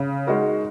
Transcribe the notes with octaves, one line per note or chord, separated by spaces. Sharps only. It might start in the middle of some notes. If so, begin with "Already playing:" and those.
Already playing: C#3
G#3 D#4 F#4 A#4